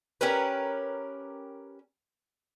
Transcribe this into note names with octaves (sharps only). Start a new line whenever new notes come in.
C#4 G4 A#4 B4